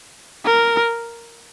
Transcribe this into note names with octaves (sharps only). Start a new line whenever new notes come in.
A#4